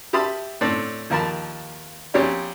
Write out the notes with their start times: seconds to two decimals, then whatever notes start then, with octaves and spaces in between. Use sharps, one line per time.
0.13 G4 E5 A5 B5 C6 D#6
0.61 A2 C4 D4 D5
1.10 D#2 F3 A#4 A5 B5
2.14 A#1 C4 G4 C#5 D5